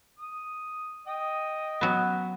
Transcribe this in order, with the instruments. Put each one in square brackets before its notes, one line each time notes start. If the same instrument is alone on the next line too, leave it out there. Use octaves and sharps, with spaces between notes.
[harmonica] D#6
D#5 G5 D#6
[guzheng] F#3 B3